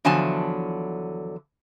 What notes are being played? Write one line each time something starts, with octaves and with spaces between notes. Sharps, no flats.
E2 D3 F3 F#3 G#5 A5